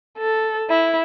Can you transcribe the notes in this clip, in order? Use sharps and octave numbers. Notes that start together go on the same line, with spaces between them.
A4
E4